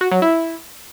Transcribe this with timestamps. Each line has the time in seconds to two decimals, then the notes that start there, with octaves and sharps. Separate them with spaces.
0.01 F#4
0.11 F#3
0.22 E4